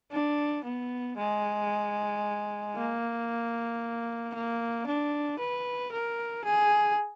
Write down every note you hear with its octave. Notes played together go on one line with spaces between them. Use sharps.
D4
B3
G#3
A#3
A#3
D4
B4
A#4
G#4